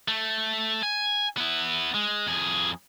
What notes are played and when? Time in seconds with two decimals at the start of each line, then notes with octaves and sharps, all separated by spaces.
0.08 A3
0.83 G#5
1.37 B3 E4
1.94 G#3
2.27 F2 G#4